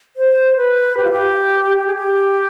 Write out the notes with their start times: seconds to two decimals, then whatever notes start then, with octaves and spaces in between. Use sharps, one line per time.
0.16 C5
0.57 B4
0.97 G4
1.04 F4
1.11 G4
1.77 G4
1.86 G#4
1.95 G4